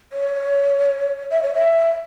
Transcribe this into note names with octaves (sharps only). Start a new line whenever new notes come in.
C#5
E5
C#5
E5